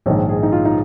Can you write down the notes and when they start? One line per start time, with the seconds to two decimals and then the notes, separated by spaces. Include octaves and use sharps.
0.06 A#1 G#2 D#3 C#5
0.29 G#4
0.43 D#4
0.52 F4
0.65 D#4